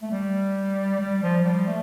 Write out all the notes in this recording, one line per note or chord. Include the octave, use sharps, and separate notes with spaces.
A3
G3
G3
F3
G3
A3